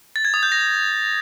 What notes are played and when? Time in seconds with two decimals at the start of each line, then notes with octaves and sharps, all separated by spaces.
0.16 A6
0.25 G#6
0.34 D#6
0.43 G6
0.52 A#6